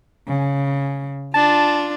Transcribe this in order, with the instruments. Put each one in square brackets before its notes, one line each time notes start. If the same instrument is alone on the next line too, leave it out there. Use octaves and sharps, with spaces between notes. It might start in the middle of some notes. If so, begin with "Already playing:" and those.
[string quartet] C#3
[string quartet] D4 F4 [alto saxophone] A5